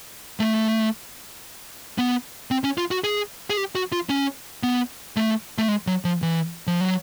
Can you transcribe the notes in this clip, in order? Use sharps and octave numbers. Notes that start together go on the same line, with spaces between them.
A3
B3
C4
C#4
F4
F#4
G#4
G#4
G4
F#4
F4
C#4
B3
A3
A3
G#3
F#3
F3
E3
F3
F#3